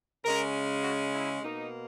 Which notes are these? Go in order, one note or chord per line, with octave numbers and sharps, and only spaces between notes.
C#3 G#3 C#4 A#4
F#4
E4
B2 A#3 D#4